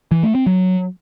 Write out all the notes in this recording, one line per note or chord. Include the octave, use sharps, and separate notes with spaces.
E3
A3
C4
F#3